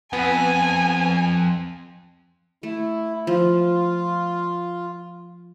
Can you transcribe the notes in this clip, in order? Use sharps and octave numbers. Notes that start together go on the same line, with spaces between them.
F2 B3 G#5
A3 E4
F3 F4